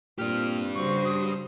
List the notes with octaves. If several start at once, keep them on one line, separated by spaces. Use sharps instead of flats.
A#2 C4 D4 G4 F6
C#3 G3 F#4 C5 C#6
D#6